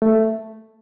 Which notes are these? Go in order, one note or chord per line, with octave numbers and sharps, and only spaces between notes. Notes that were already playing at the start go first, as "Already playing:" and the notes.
A3